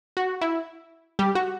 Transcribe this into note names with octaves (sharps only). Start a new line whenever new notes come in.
F#4
E4
G3 G4
F#4